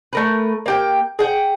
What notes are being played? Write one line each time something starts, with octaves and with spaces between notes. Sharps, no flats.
A3 A#4 B4
A#3 G4 G5
G#4 F#5 G5